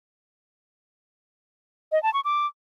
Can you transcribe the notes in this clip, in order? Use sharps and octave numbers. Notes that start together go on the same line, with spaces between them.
D#5
A5
C#6
D6